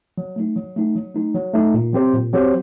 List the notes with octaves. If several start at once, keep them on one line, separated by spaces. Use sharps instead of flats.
F#3
A3 D#4
F#3
A3 D#4
F#3
A3 D#4
F#3
A3 D#4
A#2
F#3 C4 G4 C5
A#2
F#3 C4 G4 C5